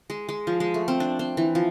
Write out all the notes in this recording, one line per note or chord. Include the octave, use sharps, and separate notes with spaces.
G#3
G#3
F3
G#3
A3
C4
D4
C4
E3
F3